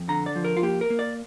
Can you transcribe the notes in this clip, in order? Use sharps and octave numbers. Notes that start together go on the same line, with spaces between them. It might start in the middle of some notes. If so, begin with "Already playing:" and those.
Already playing: F2
D3 A#5
D5
F3
A#4
F4
A#3 G4
A#4
A#3
D5